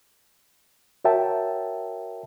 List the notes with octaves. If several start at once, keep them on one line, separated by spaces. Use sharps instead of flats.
F#4 A#4 C#5 E5 G5 A5